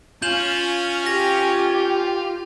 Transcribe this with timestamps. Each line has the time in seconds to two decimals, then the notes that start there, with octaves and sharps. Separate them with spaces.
0.22 C#4 F4 G6 E7 F#7
1.06 G4 A#6